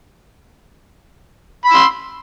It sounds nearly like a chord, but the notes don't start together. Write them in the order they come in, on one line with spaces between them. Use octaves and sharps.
B5 E6 C6